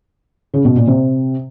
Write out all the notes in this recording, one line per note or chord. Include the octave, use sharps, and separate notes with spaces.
C#3
B2
A#2
C3